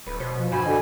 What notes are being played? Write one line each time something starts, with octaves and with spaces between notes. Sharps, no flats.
D1 B4
B2 C5
F3
G2 F#4 C5 G#5 B5
D3 D#5